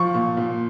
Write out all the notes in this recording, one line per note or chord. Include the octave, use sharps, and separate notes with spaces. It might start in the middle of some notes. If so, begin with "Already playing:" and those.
Already playing: F3 C#6
A#2
A#2